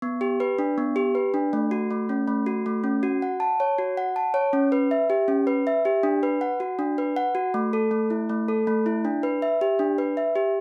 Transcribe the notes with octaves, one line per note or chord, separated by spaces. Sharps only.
B3
G4
B4
D4
B3
G4
B4
D4
A3
F#4
A3
C#4
A3
F#4
A3
C#4
F#4
F#5
A5
C#5
F#4
F#5
A5
C#5
C#4
B4
E5
G4
C#4
B4
E5
G4
D4
B4
F#5
F#4
D4
B4
F#5
F#4
A3
A4
A3
E4
A3
A4
A3
E4
D4
B4
E5
G4
D4
B4
E5
G4